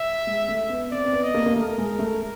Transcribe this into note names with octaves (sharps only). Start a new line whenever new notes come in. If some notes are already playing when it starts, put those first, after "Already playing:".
Already playing: E5
G#3
A3
B3
C4 D5
C4
B3
D#5
A#3
A#3
A3 A#4
G#3
A3